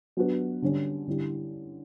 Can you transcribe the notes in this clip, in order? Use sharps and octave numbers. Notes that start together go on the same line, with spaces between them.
F#3 B3 D4 F#4 B4
D3 G3 C#4
D3 G3 C#4 E4